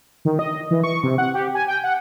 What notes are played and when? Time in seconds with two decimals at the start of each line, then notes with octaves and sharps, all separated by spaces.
0.25 D#3
0.39 D#5
0.71 E3
0.84 C#6
1.03 C3
1.18 F#5
1.34 G4
1.55 G#5
1.68 G5
1.84 F#5